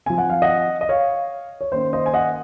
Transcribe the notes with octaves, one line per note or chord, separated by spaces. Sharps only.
F3 C4 G#5
F#5
F5
D#5 F#5
D#5
C#5 F5
C#5
D#3 A#3 C#4 C5
C5 D#5
G#5
D#5 F#5